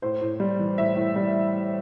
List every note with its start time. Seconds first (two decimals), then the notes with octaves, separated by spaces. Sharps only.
0.02 A2 C5
0.21 A2
0.40 G3
0.59 E3
0.78 A2 E5
0.97 A2
1.16 G3